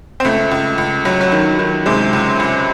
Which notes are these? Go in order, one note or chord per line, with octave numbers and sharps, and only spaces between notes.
C4
C#2 A3
C#2
C#2
C#2 F#3
F#3
D#3
D#3
C3 G#3
C#2
C#2